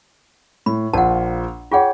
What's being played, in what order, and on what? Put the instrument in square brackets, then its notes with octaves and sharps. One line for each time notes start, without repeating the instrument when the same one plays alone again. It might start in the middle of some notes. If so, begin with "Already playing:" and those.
[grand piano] A2 [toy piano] B5
[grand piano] A#1 F4 [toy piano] F#5 A5
[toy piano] F4 G#4 F#5 [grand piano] C#5 G5